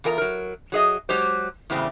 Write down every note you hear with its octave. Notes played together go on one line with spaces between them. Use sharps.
E2 F4 A#4 G#5 A#5
F#3 A#4
F#3 G#4 D#5
F#3 G#3 G4 C5
E2 A2 C#3 G3 C4